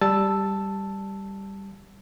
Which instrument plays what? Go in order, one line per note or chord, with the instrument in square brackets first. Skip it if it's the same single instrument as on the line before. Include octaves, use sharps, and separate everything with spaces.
[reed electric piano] G3 A5 E6